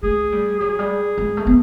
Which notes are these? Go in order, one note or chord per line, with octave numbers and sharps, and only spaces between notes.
A3 G#4
G3
F#3 G#4
G3
G#3
A3
B3